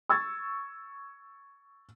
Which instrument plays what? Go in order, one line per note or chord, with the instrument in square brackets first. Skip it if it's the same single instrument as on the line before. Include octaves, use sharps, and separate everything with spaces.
[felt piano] C#6 E6 G#6 A6